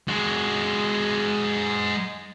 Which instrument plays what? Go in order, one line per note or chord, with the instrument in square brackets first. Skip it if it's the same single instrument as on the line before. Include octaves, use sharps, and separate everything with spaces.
[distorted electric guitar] G#3 F#4